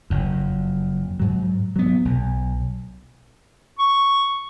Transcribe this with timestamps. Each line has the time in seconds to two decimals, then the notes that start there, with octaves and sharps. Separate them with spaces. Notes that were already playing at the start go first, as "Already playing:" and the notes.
0.10 F#1 F2
1.20 G#2 F#3
1.76 F#3 B3
2.05 B1
3.79 C#6